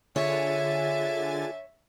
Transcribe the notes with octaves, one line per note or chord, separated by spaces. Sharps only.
D3 F4 G#4 C#5 E5 G#5 A6